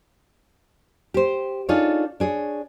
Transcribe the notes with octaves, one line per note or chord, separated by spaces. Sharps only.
G4 C5
D4 D#4 F4 G#4 A4 C#5
D4 G#4 C#5